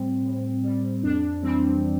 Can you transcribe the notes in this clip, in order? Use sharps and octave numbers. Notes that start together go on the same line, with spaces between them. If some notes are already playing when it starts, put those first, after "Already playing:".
Already playing: A2 G3 C4
A2
G3
F2 D4
E3 G3 C4